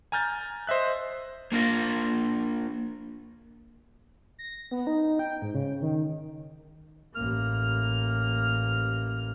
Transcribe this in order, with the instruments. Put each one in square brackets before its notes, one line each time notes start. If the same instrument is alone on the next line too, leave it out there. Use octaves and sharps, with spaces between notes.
[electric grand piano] G#5 A#5 F6 G6 A6
C5 D#5 E5 F#6
[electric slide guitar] A#3 D4 F4 A#4
[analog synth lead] A#6
B3
D#4
G5
G#2
C#3
D#3
[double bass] A1 A#3 [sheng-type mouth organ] F6